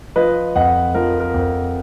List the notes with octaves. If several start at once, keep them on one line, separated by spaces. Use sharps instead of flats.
F3 B4 D#5
F2 D#5 F#5
F3 A#4
A#4
F2